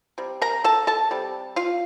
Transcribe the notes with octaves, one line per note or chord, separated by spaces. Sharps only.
C3 G3
A#4 A#5
A4 A5
A4 A5
C3 G3
F4 F5